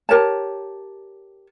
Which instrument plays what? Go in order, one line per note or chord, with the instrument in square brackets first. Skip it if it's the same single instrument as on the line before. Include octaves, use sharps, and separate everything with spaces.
[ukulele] G4 A#4 C#5 A5